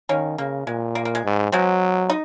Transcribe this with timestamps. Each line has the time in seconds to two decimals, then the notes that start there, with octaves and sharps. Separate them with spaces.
0.09 D#3 A#3 C#4
0.38 C#3 A#3
0.67 A#2 G#3
0.95 A#3
1.05 A#3
1.15 G#3
1.25 G#2
1.52 F#3 G#3 C4
2.10 D#4